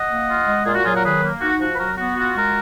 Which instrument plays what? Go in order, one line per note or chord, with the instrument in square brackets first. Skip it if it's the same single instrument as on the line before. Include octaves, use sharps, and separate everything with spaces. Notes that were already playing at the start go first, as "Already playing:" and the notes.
Already playing: [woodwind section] D#5 F#5
A#3
F4
G#3
A#2 F4 G#4
F#4
F#3 F4 G#4
F#4 A#4
D#3 G#4 B4
A#3
D#4 F#4
F3 F#4
B4
F#3 F#4 A#4
B3 F#4
F4 F#4
G#3 F#4 A#4